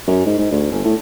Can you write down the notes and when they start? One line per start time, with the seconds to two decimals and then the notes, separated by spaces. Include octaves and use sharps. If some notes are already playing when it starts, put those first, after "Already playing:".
0.07 F#2
0.26 G#2
0.39 G#2
0.51 D2
0.72 G1
0.85 A2